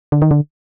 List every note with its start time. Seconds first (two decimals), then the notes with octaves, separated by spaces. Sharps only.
0.12 D3
0.22 D#3
0.31 D3